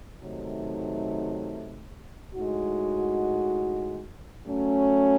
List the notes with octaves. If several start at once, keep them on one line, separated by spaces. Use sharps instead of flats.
C3 D#3 F#3 A3 D#4
A2 G#3 D#4 F#4
F#3 A3 C#4